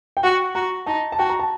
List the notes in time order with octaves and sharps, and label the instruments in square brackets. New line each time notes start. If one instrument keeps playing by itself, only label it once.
[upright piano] G5
[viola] F#4 [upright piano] F#5
[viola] F#4 [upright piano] A#5
[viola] D#4 [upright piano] A5
[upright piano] A5
[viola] F#4 [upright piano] G5
[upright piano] A#5
A5